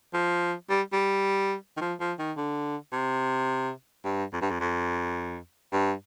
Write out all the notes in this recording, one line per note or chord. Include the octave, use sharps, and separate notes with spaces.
F3
G3
G3
D#3
F3
F3
D#3
D3
C3
G2
F2
G2
F2
F2
G2